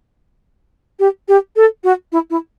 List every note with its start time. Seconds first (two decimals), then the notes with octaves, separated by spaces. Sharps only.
0.99 G4
1.28 G4
1.56 A4
1.83 F#4
2.12 E4
2.30 E4